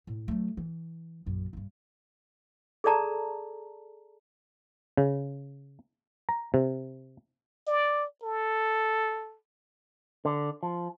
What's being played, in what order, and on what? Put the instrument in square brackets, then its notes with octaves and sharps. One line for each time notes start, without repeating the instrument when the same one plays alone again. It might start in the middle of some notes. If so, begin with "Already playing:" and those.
[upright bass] A2
F#3 A3
E3
A#1 F#2
G2 G#3
[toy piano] G#4 A4 D5 A5 A#5
[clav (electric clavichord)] C#3
A#5
C3
[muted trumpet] D5
A4
[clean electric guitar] D3
F3